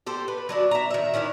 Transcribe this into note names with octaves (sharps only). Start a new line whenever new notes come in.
G4 A4 C5
B4
F#3 D4 E4
E5 A#5
D#3 E5
D#3 C#4 D4 E4